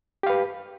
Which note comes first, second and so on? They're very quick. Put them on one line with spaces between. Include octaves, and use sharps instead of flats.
G4 F5 B4